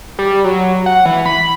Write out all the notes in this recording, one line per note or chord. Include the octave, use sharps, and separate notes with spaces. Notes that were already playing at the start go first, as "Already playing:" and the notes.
G3
F#3
F#5
E3
B5